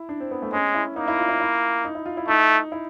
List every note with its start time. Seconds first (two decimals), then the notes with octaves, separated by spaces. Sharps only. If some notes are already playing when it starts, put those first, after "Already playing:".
Already playing: E4
0.09 D4
0.20 C4
0.31 B3
0.42 A3
0.53 G#3 C#4
0.74 E4
0.96 A#3 D#4
1.08 E4
1.18 F4
1.29 E4
1.40 E4
1.85 D#4
1.95 E4
2.06 F4
2.17 E4
2.28 A3 D#4
2.72 E4